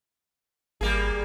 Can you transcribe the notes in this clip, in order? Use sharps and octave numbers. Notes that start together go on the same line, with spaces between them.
G#1 G3 A#3 G#4